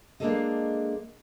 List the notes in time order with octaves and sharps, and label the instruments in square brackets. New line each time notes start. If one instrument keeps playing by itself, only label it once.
[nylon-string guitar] G#3 A#3 D4 G#4 A4 D#5